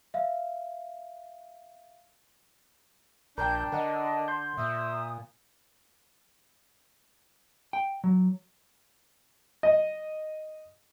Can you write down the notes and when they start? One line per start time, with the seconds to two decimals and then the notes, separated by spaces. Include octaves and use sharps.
0.14 E5 F5
3.38 A#1 D4 A#4 G5 G6
3.72 D3 A#4 D#5 F#5
4.28 C6 G6
4.58 A#2 E5 D#6
7.73 G5
8.04 F#3
9.63 D#5